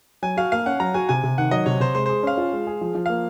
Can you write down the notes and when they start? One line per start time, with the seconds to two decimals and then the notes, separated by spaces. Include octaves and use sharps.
0.22 F#3 G#5
0.37 F#4 F5
0.52 A#3 F5
0.66 C#4 F#5
0.80 F#3 A#5
0.94 F#4 G#5
1.09 C3 G#5
1.24 C3
1.38 D#3 F#5
1.51 F#3 D#5
1.66 C3 C#5
1.80 C3 C5
1.95 G#3 C5
2.06 G#4 C5
2.23 C#4 F5
2.37 F4
2.53 G#3
2.67 G#4
2.81 F3
2.95 F3
3.06 A#3 F5